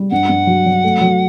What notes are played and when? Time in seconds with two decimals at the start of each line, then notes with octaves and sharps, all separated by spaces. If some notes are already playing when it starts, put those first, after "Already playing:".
Already playing: G3
0.11 G2 F#5
0.29 G2
0.47 F#3
0.66 F#3
0.84 A3
1.01 F#3